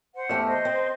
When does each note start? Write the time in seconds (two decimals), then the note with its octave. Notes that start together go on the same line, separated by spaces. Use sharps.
0.15 C5 F#5
0.29 E2 A3 G4
0.48 C5 D#5
0.65 C4